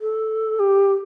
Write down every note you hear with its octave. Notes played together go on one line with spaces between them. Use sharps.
A4
G4